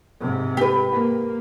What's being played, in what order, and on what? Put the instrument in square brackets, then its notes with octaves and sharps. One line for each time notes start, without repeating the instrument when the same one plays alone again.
[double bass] G#2 C3
[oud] G4 B4
[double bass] A#3